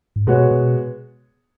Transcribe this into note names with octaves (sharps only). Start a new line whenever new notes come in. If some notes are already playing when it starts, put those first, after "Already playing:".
G#2
B2 G#3 B3 F#4 C#5
B2